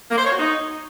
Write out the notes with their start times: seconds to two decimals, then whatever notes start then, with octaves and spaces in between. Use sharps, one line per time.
0.11 A#3
0.18 C5
0.25 C#5
0.32 F#4
0.39 D#4